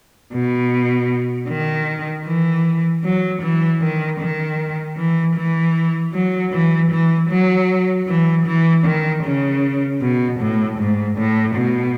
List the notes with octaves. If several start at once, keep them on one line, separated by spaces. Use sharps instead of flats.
B2
D#3
E3
F#3
E3
D#3
D#3
E3
E3
F#3
E3
E3
F#3
E3
E3
D#3
C#3
B2
A2
G#2
A2
B2